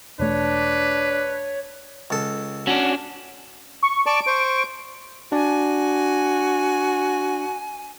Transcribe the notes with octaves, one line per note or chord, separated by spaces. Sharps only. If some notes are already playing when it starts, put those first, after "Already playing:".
E1 A3 D4 B4 C#5
C#2 A4
C#4 D4 F#4
C#6
D5 A5 C#6 D7
C5 C#6
D4 F#4 D5 G#5